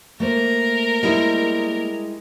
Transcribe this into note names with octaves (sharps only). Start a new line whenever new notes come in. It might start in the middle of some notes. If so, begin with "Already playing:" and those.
A3 A#3 A#4 C5
G3 G#3 E4